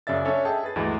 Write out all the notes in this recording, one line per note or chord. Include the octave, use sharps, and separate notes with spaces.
F#2 C#3 D5 E5 A6
C#4 D4 A4 C#5 E5
G#4 D#5 E5 G5 A5
G#4 B4 A6
D2 G2 E3 G#3